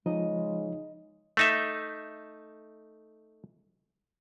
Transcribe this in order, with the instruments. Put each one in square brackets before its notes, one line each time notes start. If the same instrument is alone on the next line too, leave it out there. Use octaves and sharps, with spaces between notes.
[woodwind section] C#3 G#3 [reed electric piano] F3 [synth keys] D#4 [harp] D#5
[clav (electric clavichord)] A3 D#4 E5